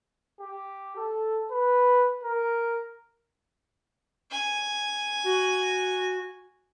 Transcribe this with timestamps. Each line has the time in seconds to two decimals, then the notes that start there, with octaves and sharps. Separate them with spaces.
0.40 G4
0.97 A4
1.51 B4
2.23 A#4
4.31 G#5
5.24 F#4